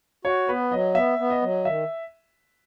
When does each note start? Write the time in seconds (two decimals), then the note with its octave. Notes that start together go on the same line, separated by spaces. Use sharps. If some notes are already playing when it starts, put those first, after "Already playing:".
0.25 F#4 C#5
0.49 B3 B4
0.72 F#3 D#5
0.95 B3 E5
1.19 B3
1.30 D#5
1.42 F#3
1.65 D#3 E5